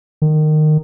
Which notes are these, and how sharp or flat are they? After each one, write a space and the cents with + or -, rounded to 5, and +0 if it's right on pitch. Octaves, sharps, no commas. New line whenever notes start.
D#3 -20